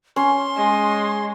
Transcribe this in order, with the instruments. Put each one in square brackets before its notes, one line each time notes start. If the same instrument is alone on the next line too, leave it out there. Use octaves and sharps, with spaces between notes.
[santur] C#4 [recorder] C6
[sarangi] G#3